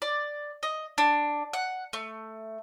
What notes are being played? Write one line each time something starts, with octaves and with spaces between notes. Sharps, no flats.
D5
D#5
D4
F#5
A3